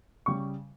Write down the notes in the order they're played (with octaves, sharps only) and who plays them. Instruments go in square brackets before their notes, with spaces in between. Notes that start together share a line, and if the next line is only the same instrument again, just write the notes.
[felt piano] C#3 G3 [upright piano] C#6